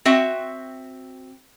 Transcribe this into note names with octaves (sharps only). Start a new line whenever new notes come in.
C4 F#4 E5